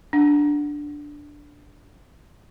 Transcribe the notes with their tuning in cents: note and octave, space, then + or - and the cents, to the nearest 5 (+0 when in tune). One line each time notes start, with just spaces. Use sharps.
D4 +0 F#5 +0